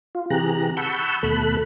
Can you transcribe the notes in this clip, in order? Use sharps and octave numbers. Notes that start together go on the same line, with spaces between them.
F4
C3 E3 G4 G#4 A#5 F#6
F#5 A5 B5 C#6 E6 G6
D#2 B2 A3 A4 B5 F#6